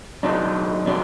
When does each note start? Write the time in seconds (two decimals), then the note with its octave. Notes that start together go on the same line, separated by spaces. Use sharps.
0.23 B2 F#3 D4 D#4
0.86 B2 F#3 D4